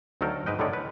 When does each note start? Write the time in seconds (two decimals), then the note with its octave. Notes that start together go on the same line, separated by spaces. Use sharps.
0.21 D2 D#3 F#3 A4 A#4 G5
0.46 G#2 B4 D#5 G5
0.59 A2 D3 D#3 G#3 C#5 D5
0.73 B4